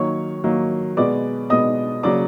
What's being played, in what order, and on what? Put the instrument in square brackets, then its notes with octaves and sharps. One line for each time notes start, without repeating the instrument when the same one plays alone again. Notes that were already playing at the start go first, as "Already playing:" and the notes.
Already playing: [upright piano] D#3 F#3 A#3 C#5 C#6
D#3 F#3 A#3
B2 G#3 B3 D5 D6
B2 G#3 B3 D#5 D#6
C#3 F#3 A#3 D5 D6